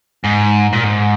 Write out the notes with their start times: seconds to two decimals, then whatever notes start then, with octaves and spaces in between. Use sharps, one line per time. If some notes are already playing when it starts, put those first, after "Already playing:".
0.25 G#2
0.73 A#2
0.84 G#2